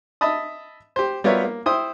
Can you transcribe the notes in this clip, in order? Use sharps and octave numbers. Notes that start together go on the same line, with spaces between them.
D#5 E5 A5 B5 D#6
G4 C5
G3 B3 F4 A#4 C#5 E5
A#3
E4 C5 G5 D#6